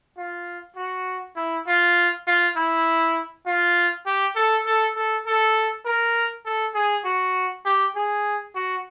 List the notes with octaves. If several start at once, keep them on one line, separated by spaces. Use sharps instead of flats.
F4
F#4
E4
F4
F4
E4
F4
G4
A4
A4
A4
A4
A#4
A4
G#4
F#4
G4
G#4
F#4